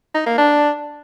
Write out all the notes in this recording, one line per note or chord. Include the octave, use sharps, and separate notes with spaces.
D#4
A#3
D4